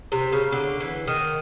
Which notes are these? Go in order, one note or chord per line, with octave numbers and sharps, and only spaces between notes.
C3
C#3
D3
E3
D#3